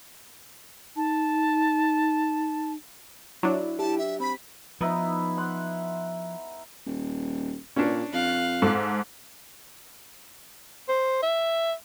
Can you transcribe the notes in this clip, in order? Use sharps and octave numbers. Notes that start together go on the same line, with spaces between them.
D#4 A5
F#3 D4 E4
G4 A5
E5
C4 B5 B6
F3 B3 D#4 E4
F#5 C6
D#1
A#2 C#4 D4
F2 F5 F#6
G#2 A4
C5
E5